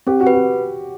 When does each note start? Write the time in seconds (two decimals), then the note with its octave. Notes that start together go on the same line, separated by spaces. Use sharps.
0.07 C4 G4
0.21 F#4
0.27 B4
0.34 F#4